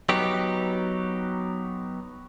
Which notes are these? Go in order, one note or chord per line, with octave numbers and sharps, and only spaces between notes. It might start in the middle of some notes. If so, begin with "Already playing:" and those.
F#3 B3 D#4 G4